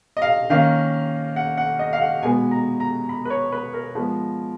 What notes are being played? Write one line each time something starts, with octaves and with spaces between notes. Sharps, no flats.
D#5
F5
D#3 A#3 C#4 F5
F#5
F#5
D#5
F5
F#5
B2 G#3 B3 G#5
A#5
A#5
B5
B4
C#5
B4
A#4
F3 G#3 B3